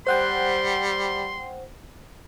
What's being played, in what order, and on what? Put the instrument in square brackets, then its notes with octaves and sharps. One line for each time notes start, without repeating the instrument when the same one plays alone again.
[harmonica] G3 [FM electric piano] C5 F#5 G5 [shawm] C6